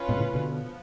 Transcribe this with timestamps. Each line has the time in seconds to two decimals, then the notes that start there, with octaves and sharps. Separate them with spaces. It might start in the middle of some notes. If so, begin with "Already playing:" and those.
Already playing: C#4 F4 B4
0.08 G#2 B2
0.17 A2 C#3
0.34 B2 D3
0.51 F3 B3